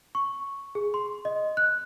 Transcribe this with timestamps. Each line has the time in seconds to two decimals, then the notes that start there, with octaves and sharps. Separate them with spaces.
0.15 C#6
0.75 G#4
0.94 C6
1.25 D#5
1.57 F#6